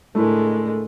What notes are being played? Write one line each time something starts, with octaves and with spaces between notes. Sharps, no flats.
A2 D3 G#3 A3 E4 A#4